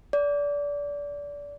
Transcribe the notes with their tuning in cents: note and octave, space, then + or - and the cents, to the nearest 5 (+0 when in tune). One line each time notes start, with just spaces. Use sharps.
D5 -25